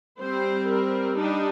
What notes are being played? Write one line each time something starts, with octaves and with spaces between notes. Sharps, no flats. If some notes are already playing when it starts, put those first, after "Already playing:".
G3 C4 C5
A#4
G3 D4 D#4